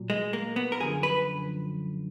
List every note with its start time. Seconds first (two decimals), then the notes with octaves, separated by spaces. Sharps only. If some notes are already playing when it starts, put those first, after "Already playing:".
Already playing: A#2 F#3
0.10 G#3
0.33 A#3
0.56 B3
0.72 A#4
0.80 F#2 D3 F3 G#4
1.03 B4